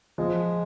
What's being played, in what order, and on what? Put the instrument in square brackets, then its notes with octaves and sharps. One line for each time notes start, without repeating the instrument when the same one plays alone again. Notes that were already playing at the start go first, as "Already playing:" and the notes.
[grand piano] F3 [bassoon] G#3